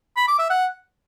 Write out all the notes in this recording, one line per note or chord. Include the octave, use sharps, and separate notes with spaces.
B5
D6
E5
F#5